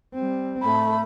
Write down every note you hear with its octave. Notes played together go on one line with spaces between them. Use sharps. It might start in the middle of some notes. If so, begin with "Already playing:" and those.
G3 C4
A2 A3 B5